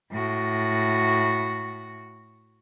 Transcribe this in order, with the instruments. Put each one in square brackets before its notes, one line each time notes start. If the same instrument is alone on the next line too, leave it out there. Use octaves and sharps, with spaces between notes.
[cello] A2 F#4